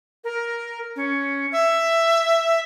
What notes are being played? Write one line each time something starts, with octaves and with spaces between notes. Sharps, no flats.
A#4
C#4
E5